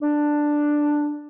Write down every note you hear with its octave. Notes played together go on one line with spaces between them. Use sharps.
D4